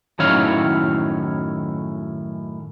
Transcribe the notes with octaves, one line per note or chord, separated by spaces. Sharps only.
F#2 A2 D#3 E4 C#5 F5